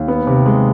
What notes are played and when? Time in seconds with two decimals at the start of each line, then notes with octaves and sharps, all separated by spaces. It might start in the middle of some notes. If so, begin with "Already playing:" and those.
Already playing: D#2
0.08 B3
0.27 C3
0.46 G#3